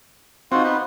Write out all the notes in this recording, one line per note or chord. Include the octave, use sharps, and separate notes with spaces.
C4 D#4 F4 F#4 F#5
B3 B4